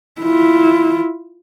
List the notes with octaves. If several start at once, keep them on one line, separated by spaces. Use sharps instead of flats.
E4 F4